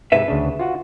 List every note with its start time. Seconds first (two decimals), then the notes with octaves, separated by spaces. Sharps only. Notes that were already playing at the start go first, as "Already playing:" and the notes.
0.12 G#2 C3 B4 E5
0.28 D2 C#3 D4
0.59 F4 F#4 F#5